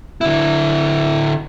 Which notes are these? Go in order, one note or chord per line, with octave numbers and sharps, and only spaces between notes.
D3 E4